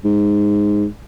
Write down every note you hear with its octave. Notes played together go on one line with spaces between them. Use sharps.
G#2